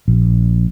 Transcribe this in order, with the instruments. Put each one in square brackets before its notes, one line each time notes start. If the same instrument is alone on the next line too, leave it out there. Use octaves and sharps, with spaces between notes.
[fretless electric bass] A#1